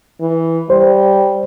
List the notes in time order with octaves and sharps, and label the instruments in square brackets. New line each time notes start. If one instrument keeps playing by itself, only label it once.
[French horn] E3
[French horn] G3 [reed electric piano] C5